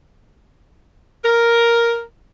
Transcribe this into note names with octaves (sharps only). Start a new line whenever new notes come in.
A#4